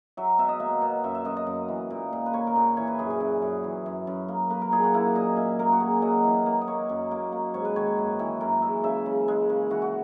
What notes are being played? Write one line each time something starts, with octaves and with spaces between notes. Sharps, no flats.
F#3 E5
B2 E5
D#5
A#3 E5
B2
F#2 E5
E5
F#2 D#5
D#5
F#2
E3
A#2
A#2
B4
A#3 C#5
A#4
A#2 B4
E3 C#5
B4
F#2 G#4
G#4
F#2
F#2
E3
F#2
F#2
A#3
A#3 B4
A#4
A#2 G#4
F#4
A#3 E4
A#2 D#5
A#2 E5
A#3 A#4
F#4
A#3 G#4
F#3 D#5
E3
A#3
D#5
A#3 C#5
F#2
A#3
A#3
G#2 C#5
B4
D#3 C#5
F#2
E3
F#2 A#4
G#3 E5
C#3 E5
C#3
G#3
C#3
E3 F#4
F#4